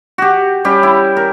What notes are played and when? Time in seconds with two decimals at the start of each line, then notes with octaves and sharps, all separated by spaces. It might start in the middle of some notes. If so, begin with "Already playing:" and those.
0.18 F#4 G4
0.64 G3 C#4 G4
0.83 E4
1.17 A#4